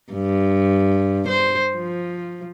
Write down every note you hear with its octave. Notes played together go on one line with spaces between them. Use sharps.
G2
C5
F3